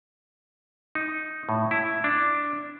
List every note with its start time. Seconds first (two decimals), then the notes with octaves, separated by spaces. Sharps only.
0.95 D#4
1.49 A2
1.71 E4
2.04 D4